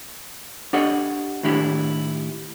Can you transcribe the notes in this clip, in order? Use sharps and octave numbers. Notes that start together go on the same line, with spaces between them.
D4 G4 A4 C#5 D#5 F#5
A2 D#3 D4 E4 G4